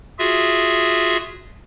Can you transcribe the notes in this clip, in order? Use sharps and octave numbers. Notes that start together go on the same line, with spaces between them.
F4 F#4 G#4 E5